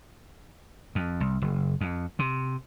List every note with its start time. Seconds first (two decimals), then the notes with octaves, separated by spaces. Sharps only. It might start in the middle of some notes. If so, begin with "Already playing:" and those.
0.95 F2
1.20 C2
1.42 F#1
1.81 F2
2.19 C3